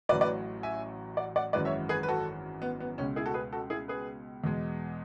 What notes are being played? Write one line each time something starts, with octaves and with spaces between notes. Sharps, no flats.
A1 A2 F#3 B4 D5
B4 D5
E5 G#5
D5 F#5
D5 F#5
G#1 F#2 E3 G#3 B4 D5
C#5 E5
G#4 B4
B4
F#4 A4
B3
B3
C#2 B2 G#3 C#4
E4 G#4
F#4 A4
G#4 B4
F#4 A4
E4 G#4
G#4 B4
E2 B2 G#3